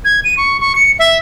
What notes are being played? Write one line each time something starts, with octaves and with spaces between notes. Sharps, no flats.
G#6
D#7
C#6
C#6
C#7
E5